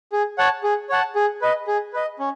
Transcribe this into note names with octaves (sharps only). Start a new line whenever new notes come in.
G#4
C#5 F#5 A5
G#4
C#5 F#5 A5
G#4
B4 D#5
G#4
B4 D#5
C#4